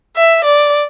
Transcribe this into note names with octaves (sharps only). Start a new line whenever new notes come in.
E5
D5